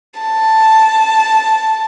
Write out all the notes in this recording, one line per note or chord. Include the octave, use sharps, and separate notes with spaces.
A5